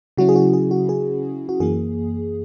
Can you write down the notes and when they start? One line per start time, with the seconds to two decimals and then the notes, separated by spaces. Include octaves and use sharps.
0.17 C#3 F#3 C#4 E4 F#4
0.29 G#4
0.36 F#4
0.53 G#4
0.71 F#4
0.89 G#4
1.49 F#4
1.60 F#2 E3 A#3 G#4